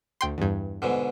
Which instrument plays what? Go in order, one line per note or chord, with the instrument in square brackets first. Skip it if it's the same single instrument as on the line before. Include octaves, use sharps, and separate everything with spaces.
[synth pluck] D2 G5 C6
E2 G2
[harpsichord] G#2 B2 D3